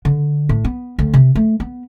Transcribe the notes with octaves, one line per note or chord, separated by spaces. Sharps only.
D3
A2
B3
D2
C3
A3
B3